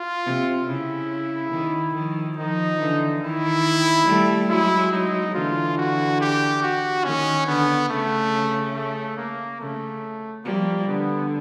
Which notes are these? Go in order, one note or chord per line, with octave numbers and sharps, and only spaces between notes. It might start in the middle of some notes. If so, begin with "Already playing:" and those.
Already playing: F4
C3
C#3 E4
D#3
D#3 F3
D#3 F3 D#4
D3 E3
D#3 E4
G3 A3
F#3 G#3 E4
D#4
D3 E3 F4
F#4
G4
F#4
D#3 C#4
D3 B3
C#3 A3
A3
A#3
C#3 A3
F3 G3 A#3
D3 B3